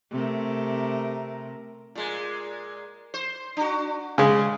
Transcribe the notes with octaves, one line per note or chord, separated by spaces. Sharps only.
C3 A3 A#4
A#2 G#3
C5
D4 F#4
C#3 G#3